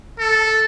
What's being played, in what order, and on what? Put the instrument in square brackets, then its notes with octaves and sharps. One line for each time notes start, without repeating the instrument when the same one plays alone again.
[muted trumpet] A4